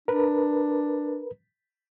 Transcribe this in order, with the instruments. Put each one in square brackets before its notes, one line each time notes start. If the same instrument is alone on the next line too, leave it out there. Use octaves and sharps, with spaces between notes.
[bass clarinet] D4 [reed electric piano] A#4 B4